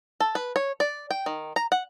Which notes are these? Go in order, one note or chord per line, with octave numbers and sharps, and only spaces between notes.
A4
B4
C#5
D5
G5
D#3
A#5
F#5